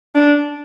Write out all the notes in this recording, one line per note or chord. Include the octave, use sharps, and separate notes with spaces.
D4